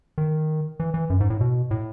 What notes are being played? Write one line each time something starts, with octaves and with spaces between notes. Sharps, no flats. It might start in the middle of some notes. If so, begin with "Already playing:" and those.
D#3
E3
E3
F#2
G#2
A2
B2
A2